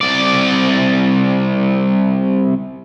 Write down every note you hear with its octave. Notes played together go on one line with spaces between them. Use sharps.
C2 D5